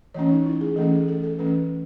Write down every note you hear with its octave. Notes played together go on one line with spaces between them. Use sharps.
E3 A3 C#4 C#5
D#4
E4
G#4
E3 A3 C#4 A4
G#4
A4
A4
E3 A3 C#4 B4